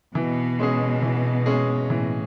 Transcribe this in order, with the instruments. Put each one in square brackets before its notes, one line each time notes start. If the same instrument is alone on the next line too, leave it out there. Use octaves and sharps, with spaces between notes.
[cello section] B2 [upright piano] E3
[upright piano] G#3 C#4 G#4
E3
G#3 C#4 G#4
[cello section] A2 [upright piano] E3